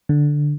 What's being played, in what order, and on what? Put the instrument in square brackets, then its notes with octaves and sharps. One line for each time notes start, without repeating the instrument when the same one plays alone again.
[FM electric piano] D3